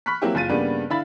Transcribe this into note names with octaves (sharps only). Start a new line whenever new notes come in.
B5 C#6 F6 F#6 B6
F#3 A#3 C4 E4 G4
F#1 F4 A6 D#7
G2 C#3 G3 A#3 B3
D3 E4 F5 B5 A6